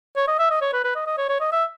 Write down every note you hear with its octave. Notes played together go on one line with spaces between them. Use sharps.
C#5
D#5
E5
D#5
C#5
B4
B4
D#5
D#5
C#5
C#5
D#5
E5